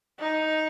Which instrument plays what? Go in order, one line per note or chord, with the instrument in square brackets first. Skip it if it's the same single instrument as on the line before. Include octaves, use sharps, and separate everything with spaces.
[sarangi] D#4